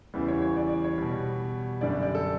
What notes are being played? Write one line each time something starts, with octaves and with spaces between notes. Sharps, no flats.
E2 C#3 E3 G3
C#5
C#5
D5
D5
C#5
B2 G3
F#2 D3 G3 D5
D5
A4